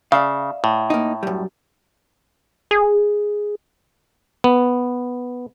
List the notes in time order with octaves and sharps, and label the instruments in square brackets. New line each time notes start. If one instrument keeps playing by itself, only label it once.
[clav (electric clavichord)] C#3 [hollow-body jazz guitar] D5 E5 F5
[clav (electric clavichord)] A2
[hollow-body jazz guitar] A#3 D#4
F#2 G3
[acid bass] G#4
[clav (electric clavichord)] B3